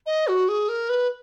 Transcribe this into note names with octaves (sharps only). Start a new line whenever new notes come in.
D#5
F#4
G#4
A#4
B4